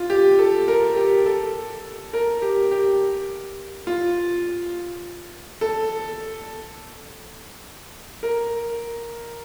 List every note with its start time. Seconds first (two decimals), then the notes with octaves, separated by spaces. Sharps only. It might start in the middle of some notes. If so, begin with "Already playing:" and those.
Already playing: F4
0.10 G4
0.39 A4
0.68 A#4
0.96 G4
1.26 A4
2.13 A#4
2.42 G4
2.71 G4
3.87 F4
5.61 A4
8.23 A#4